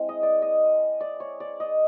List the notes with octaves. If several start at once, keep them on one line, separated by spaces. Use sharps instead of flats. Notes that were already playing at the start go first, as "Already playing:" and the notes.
Already playing: G#3 C4 E4
D#5
D5
D#5
D5
C#5
D5
D#5